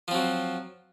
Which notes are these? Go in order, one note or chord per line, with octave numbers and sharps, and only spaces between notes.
F3 F#3 C4